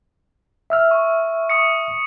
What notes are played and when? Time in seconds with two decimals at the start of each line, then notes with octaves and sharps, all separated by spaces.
0.70 E5 E6 F6
0.91 C#6
1.49 C#6 D#6 C#7